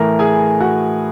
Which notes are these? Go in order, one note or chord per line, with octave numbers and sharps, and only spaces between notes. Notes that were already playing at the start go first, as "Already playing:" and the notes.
Already playing: A2 E3 A3 A#4 A#5
G#4 G#5
F#4 F#5